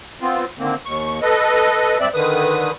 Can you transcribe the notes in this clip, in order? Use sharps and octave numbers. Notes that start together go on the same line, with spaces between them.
B3 C4 F4
D3 D#3 A#3 C4
D#2 C#6
A4 B4 D#5
G2 C4 D5 E5 F#6
D3 D#3 B4 D#6